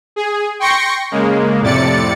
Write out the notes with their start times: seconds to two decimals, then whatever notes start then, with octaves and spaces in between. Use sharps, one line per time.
0.16 G#4
0.59 G5 C6 C#6 A#6 C#7
1.11 C#3 G#3 A#3
1.61 F2 A2 C3 D5 A6 C#7